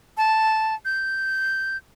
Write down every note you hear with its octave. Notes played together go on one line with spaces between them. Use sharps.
A5
G6